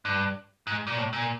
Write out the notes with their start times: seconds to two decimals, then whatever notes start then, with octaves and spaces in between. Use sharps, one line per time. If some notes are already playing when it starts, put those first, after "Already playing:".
0.05 G2
0.67 G#2
0.87 A#2
0.98 A2
1.13 A#2